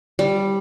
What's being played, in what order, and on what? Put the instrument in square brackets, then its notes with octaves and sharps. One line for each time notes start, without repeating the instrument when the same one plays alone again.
[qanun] G3